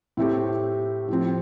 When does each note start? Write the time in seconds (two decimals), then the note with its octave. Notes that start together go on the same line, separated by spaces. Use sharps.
0.17 A2 A3 C4 G4
1.08 A2 F3 C4